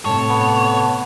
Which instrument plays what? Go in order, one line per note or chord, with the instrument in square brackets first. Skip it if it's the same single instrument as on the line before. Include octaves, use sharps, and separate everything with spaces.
[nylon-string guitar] A2 C3 [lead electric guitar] C#5 [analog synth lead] A5
[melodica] B3